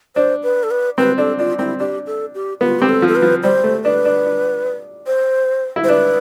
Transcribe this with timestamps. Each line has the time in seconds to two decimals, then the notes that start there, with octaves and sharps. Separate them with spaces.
0.16 D4 C5
0.43 B4
0.63 A4
0.71 B4
0.98 C4 B4
1.18 D4 A4
1.39 D4 F4
1.59 C4 E4
1.80 D4 G4
2.07 A4
2.35 G4
2.61 B3 F4
2.80 C4 G4
2.89 A4
3.02 F3
3.08 A4
3.16 B4
3.22 F3
3.43 G3 C5
3.64 A3
3.84 D4 B4
4.05 D4
4.26 D4
5.07 C5
5.76 E4
5.84 C5
5.89 D4 B4